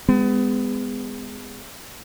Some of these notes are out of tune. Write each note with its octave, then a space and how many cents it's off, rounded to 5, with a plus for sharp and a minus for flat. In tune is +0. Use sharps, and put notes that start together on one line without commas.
G#3 -20 B3 +25